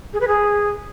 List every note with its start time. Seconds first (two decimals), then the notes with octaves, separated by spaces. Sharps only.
0.13 G#4
0.21 B4
0.28 G#4